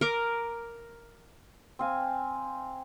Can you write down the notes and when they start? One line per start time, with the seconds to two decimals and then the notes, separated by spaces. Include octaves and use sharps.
0.01 A#4 D6
1.79 C4 F5 G#5